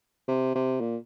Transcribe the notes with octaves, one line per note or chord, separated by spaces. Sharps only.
C3
C3
A#2